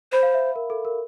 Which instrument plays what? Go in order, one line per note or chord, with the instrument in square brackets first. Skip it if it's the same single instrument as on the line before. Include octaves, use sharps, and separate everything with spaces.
[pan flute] C5 [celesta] B5
[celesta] F5
E5
A#4
A4
A#4